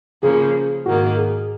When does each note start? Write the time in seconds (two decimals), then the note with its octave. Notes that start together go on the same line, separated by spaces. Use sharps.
0.22 C#3 F3 A#3 G#4
0.85 G#2 D#3 A#3 F#4
1.17 G#4